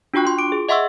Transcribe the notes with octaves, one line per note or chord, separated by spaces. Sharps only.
D4 F4 F#4 G5 C#6 F#6
F4 C6
D6 D7
G#4
D#5 E5 F#5 C6 C#6 E6